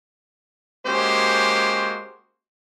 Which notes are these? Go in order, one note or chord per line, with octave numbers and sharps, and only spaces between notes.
G#3 A#3 C#4 F#4 G4 C5